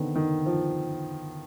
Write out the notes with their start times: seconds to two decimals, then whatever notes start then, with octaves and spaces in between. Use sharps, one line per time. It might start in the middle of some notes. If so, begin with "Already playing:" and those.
Already playing: D3 D#3 B3 C4
0.15 D#3
0.46 F3